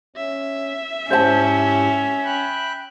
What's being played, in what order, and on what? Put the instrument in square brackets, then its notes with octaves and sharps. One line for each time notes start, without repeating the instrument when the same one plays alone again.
[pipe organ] C#4 [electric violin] E5
[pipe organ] G#2 E4 G4 [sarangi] C#4 [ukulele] C5 A5
[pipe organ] G5 B5 F#6